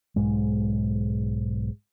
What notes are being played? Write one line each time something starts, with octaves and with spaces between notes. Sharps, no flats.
B1 G#2 G#3